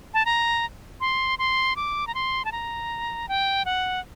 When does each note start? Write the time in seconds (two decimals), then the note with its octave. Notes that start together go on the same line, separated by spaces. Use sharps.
0.14 A5
0.25 A#5
1.00 C6
1.39 C6
1.76 D6
2.07 A#5
2.15 C6
2.45 A5
2.52 A#5
3.29 G5
3.65 F#5